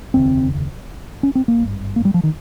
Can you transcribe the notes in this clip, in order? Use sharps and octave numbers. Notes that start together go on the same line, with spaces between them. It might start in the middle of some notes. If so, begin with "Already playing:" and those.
F1 D#2 C#3 C4
C#4
C4
A#3
G#1 G2
A#3
G3
F3
D#3